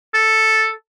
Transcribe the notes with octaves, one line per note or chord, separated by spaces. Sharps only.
A4